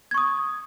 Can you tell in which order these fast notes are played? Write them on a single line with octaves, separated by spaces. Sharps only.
G#6 C#6 D#6